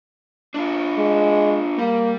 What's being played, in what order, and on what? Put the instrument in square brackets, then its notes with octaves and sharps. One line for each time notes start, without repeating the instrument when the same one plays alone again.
[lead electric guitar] D4 F4
[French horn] G#3
[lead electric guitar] G3 [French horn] A#3